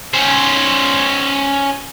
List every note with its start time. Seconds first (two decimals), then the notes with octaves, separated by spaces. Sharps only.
0.13 C#4 C5